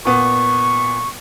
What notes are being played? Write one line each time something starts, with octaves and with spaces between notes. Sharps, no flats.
A#2 B3 C#6